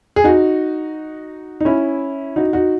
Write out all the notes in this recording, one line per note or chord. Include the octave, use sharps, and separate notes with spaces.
G#4
D#4 F#4
D#4
C#4 E4
D#4 F#4
D#4 F#4